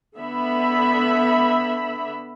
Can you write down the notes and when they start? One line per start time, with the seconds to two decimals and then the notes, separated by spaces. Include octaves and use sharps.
0.17 D3 B3 E5 B5